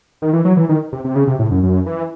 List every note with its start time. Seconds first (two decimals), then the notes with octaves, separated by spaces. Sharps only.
0.22 D#3
0.33 E3
0.45 F#3
0.57 E3
0.69 D#3
0.92 C3
1.04 C3
1.16 C#3
1.27 C3
1.39 A2
1.51 F#2
1.63 F#2
1.86 E3